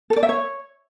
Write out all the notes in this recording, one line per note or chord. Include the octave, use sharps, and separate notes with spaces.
A4
D5
E5
C#5